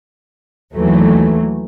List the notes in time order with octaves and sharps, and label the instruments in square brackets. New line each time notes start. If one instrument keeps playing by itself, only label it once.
[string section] D#2 E3 F#3 A3